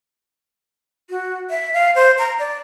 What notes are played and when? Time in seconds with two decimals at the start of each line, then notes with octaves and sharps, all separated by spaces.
1.10 F#4
1.50 E5
1.74 F5
1.95 C5
2.18 A#5
2.39 D5